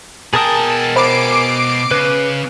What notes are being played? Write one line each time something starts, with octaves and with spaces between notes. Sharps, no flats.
B2 G#4 A#4 G5 A5 D#6
C5 B5 D6 C7 D7
C#3 B4